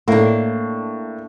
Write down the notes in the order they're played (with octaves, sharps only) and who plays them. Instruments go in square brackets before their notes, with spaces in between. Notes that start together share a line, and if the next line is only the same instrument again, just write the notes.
[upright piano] A2 [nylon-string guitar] A#3 D4